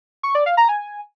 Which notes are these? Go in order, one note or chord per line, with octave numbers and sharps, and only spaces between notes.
C#6
D5
F5
A#5
G#5